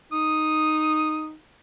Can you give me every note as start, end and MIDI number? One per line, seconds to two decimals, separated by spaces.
0.12 1.35 63
0.12 1.26 87